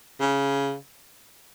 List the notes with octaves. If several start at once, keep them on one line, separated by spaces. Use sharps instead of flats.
C#3